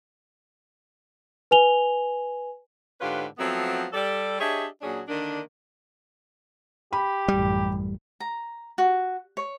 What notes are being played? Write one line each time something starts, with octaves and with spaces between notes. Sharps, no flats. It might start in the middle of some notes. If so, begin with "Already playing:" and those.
B4 G#5 F7 G7
G#2 D3 C#4 F4 G4 B4
F3 F#3 A3 B3 C4
G3 A4 D5
D4 G4 G#4 C#5 D#5 E5
A#2 F#3 C#4 D4 G#4
D3 D#3 A#3 D4
G4 B5
A1 F#2 G3
A#5
F#4
C#5